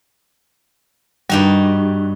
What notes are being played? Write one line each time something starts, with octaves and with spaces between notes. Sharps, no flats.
G2 G3 D#4 F#4